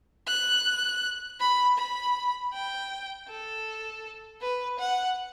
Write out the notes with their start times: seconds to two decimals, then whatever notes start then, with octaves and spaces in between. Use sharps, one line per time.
0.27 F#6
1.40 B5
1.78 B5
2.53 G5
3.28 A4
4.41 B4
4.79 F#5